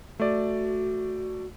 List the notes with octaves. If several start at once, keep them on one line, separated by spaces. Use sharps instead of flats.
A3 F#4 D5